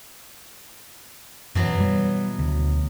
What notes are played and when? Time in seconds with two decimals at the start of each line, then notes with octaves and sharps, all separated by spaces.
1.55 F#2 B2 E3 F#3
1.80 G3
2.39 D2